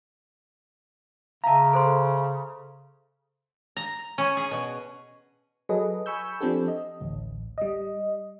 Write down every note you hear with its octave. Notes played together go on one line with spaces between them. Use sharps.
C#3 E5 F5 A5 A#5
A4 C5 C6
A#5
C#4
G#4
B2
F#3 G#4 A4 B4 D#5
G#5 B5 C#6 E6 G6
F3 C4 D4 G4 A4
D#5
A1 D2
G3 D#5